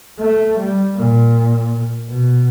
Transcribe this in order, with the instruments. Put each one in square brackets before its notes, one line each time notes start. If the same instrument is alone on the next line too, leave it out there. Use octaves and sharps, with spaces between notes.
[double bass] A3
G3
A#2
B2